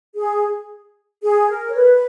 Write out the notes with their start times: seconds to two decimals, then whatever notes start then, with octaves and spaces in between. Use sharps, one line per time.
0.16 G#4
1.23 G#4
1.49 A#4
1.68 C#5
1.75 B4